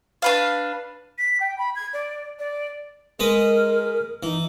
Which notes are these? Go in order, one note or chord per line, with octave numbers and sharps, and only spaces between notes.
D4 B4 F5
B6
G5
B5
G#6
D5
D5
G#3 A#4 B4 D#6
E3 D#4